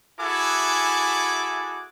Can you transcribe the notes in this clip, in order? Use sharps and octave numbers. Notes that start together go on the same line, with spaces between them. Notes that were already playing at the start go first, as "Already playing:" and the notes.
E4 F#4 G#4 A4 G#5 D6